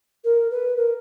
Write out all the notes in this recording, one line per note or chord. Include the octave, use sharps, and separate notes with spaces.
A#4
B4
A#4